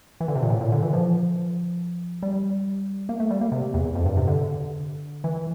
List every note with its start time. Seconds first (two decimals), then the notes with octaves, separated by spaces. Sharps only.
0.20 E3
0.28 D3
0.35 C3
0.42 A#2
0.50 A2
0.61 A#2
0.72 D3
0.82 E3
0.93 F3
2.23 G3
3.09 A#3
3.20 A3
3.30 G3
3.41 A#3
3.52 C3
3.74 E2
3.95 F2
4.06 G2
4.17 C3
4.28 D3
5.24 E3